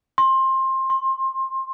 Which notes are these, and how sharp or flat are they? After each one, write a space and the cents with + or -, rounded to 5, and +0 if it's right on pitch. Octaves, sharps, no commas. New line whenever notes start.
C6 +20
C6 +30